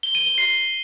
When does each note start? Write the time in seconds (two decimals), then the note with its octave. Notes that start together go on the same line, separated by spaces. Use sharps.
0.03 G7
0.15 D#7
0.26 G7
0.38 C7